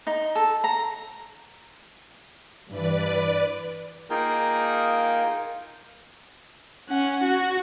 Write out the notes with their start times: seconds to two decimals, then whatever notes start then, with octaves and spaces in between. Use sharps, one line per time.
0.07 D#4
0.35 A4
0.64 A#5
2.70 G2 E3 B4 D5
4.10 A#3 D#4 F4 G#4 A#4 G5
6.89 C#4 F#5
7.24 F#4